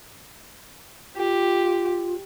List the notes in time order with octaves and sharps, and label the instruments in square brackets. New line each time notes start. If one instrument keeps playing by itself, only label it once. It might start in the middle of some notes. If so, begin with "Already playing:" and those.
[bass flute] F4 [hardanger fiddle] G4